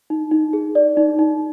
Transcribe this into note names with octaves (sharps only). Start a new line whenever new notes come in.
D#4
D#4
G#4
D5
D#4
D#4